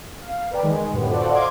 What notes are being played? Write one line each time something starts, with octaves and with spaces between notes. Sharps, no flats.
F5
A#4 B4 D5 G5
D#3 G#3
F#2 A2 D3 B3 G4
F4 F#4 A4 C5 D5 F#5
D#5 F5 F#5 C6 D6 G#6